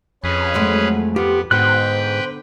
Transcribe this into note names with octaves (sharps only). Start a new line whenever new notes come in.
F2 C#4 G#4 B4
F#3 G#3 A3
B3 F4 G4
G#2 D3 B3 F#4 B4 C5 G5 F#6